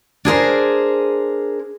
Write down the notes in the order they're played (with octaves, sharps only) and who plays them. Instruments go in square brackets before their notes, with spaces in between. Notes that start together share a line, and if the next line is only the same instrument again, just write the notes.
[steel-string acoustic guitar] D4 G#4 A#4 C5